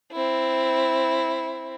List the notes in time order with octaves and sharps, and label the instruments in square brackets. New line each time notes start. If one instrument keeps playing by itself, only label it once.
[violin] C4 E4